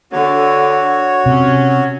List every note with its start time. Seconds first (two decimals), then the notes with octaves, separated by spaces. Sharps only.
0.12 D3 F#4 C#5
1.26 C3 F#3 C#4